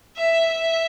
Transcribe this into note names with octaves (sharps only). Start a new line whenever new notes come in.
E5
E5